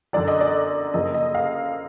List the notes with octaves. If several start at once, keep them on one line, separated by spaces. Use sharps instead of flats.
F#2 D3 F#3 D5
D#5
D5
F#2 C#3 F3 A#3 D#5
D#5
F5